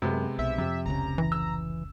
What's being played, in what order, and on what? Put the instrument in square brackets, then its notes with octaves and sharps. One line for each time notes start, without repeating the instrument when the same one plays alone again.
[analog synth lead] F#2 [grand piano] C3 G#3 B3
[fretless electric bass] B1 [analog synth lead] E5
[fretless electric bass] F2 [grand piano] C3
[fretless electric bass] F1 C#2 C#3 [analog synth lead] A#5
[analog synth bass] E3
[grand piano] E6